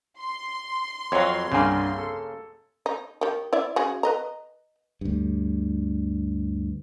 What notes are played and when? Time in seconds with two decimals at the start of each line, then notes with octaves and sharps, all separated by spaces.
0.18 C6
1.12 F2 F#3 C#5 F5
1.52 C2 G2 C#3 A#3 G#5
1.98 A4
2.86 D#4
3.21 D#3 G4
3.53 E4 D5 E5
3.76 C#3 F#4 G#4
4.03 B4 D#5 A#5
5.01 D2 G2